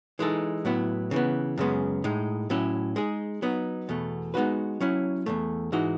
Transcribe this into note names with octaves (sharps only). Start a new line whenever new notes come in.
E3 G#3 D#4 A4
A2 F#3 B3 E4
C#3 E3 B3
F#2 C#3 G#3 B3
A2 G#3 D#4
A2 F#3 C#4 E4
G#3 D#4 G#4
F#3 B3 D#4
E2 B2 A3
G#3 B3 D#4 F#4 B4
F#3 C#4 E4
E2 B2 A3
G#2 E3 G#3 D#4 F#4